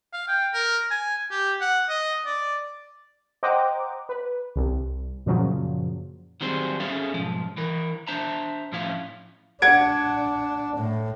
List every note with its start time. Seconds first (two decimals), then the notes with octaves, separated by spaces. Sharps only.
0.13 F5
0.28 G5
0.53 A#4
0.90 G#5
1.31 G4
1.61 F#5
1.89 D#5
2.25 D5
3.43 C5 D#5 F#5 G5 A#5 D6
4.09 B4
4.56 C2
5.26 F#2 A#2 C#3 F3 F#3
6.41 D#3 F#3 G3 C4 G#4 C5
6.80 C#4 G#4 A4 E5 F5
7.14 B1 G#2 F3
7.57 E3 A#4
8.07 D4 C5 E5 A5 A#5
8.72 A2 F3 C#4 E4 F5
9.62 D4 F#5 G#6 D7
10.76 A2